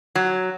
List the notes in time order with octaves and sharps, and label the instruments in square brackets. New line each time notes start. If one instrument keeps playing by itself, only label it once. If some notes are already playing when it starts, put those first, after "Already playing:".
[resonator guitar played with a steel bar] F#3